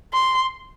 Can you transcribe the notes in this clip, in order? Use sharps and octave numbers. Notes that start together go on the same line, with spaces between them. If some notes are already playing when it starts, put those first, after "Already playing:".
C6